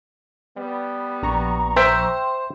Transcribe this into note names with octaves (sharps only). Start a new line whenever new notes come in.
G3 B3
A#1 A#5 C#6
C5 E5 G5